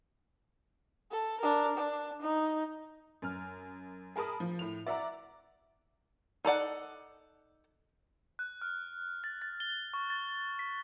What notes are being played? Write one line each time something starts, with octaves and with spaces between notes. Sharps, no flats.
A4
D4 A#4
D4
D#4
F#2 F6
G#4 A#4 A5 B5 D#6
F3
A2 F7
D5 E5 F#5 A#5 D6
D#4 A4 D5 F#5
F#6
F6
A6
A6
G7
C#6
A6
B6